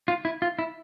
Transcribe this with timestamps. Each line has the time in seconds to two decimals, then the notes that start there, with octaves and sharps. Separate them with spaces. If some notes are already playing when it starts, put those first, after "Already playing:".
0.08 F4
0.25 E4
0.42 F4
0.59 E4